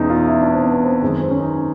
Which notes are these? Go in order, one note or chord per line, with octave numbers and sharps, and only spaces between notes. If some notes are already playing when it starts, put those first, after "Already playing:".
Already playing: E2 B2 G#3 C#4 D#4
F4
E4
D4
C4
B3
C4
F#2 D#3 G#3 C4
C4
C#4
D#4